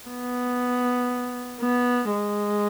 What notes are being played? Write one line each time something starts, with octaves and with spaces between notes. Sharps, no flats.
B3
B3
G#3